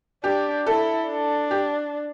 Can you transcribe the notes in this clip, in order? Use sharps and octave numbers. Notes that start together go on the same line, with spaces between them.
D4 G4
E4 A4
D4
G4